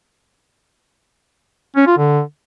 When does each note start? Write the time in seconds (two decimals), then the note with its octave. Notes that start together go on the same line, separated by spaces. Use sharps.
1.76 C#4
1.87 F4
1.97 D3